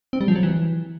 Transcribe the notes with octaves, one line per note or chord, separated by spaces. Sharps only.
C4
G3
F3
F#3
E3